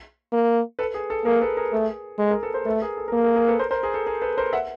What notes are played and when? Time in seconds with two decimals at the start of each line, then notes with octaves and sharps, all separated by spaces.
0.33 A#3
0.79 A4 B4
0.94 G#4
1.10 A4
1.25 A#3 G#4 A#4
1.42 A4 B4
1.57 G#4 A#4
1.73 A3 G#4
2.19 G#3 A4
2.31 G#4 A#4
2.43 A4 B4
2.54 A#4 C5
2.66 A3 A4 B4
2.82 G#4 A#4
2.97 A4
3.08 A#4
3.12 A#3 A4
3.24 G#4 A#4
3.36 G#4 A#4
3.48 A4 B4
3.59 A#4 C5
3.71 A#4 C5
3.83 G#4 A#4
3.94 A4
4.06 G#4 A#4
4.22 A4 B4
4.38 A#4 C5
4.53 E5 F#5